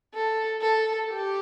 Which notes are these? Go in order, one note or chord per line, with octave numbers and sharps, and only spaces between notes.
A4
A4
G4